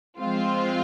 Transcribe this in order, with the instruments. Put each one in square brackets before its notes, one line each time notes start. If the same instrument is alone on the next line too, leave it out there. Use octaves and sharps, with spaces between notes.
[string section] F3 G#3 C4 F4